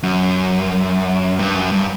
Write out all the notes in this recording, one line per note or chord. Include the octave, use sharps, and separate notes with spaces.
F#2
G2
F#2
G2